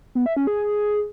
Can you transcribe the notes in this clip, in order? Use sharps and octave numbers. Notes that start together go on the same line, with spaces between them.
B3
E5
C#4
G#4